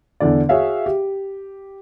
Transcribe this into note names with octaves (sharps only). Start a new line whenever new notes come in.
E2 D3 D5
F#4 G#4 C#5 E5 F5
G4